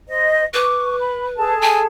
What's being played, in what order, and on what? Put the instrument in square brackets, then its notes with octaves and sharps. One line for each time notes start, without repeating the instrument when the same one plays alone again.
[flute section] C5 D#5
[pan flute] B4 [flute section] C#6 D6
[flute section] B5
G#4 A4 A5
[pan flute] G#5